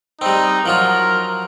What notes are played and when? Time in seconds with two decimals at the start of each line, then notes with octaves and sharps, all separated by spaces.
0.21 G3 C4 D#4
0.66 F3 F#3 F4 A#4